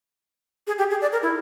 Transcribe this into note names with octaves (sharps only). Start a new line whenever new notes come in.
G#4
G4
G#4
D5
A#4
E4